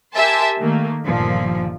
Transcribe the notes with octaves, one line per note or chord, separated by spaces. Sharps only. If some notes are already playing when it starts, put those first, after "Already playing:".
G4 A#4 E5 G#5 A5 C6
D#3 A3 A#3
G1 D#2 A#2 F3